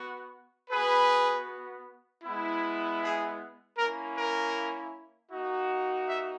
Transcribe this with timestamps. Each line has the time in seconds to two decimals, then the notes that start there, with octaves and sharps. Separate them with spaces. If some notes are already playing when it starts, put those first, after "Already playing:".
Already playing: B3 F#4
0.70 B3 F#4 G#4 B4
2.24 G#3 B3 E4
3.01 G#4
3.78 A#3 C#4 E4 A#4
4.17 A#4
5.31 A#3 D#4 F#4
6.08 E5